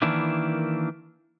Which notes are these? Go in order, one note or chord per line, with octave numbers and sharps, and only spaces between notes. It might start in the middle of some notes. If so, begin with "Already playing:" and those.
D#3 E3 A#3 D4 E4